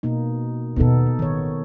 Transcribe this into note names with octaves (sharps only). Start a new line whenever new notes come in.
B2 A#3 D#4
D#2 B2 B3 D#4 A4
A1 D#3 C#5